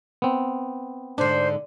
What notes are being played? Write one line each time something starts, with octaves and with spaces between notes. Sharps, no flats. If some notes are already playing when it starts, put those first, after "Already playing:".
B3 C4
G#2 D3 D4 C5